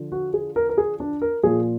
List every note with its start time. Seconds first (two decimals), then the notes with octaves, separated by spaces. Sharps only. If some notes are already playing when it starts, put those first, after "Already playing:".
Already playing: D3 F3
0.12 F#4
0.34 G#4
0.56 A#4
0.69 A#4
0.78 G#4
1.00 D4
1.22 A#4
1.43 A#2 F3 G#4